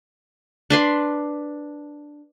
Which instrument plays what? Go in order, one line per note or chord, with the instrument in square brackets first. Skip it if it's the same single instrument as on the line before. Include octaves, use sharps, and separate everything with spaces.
[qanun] D4 B4 C6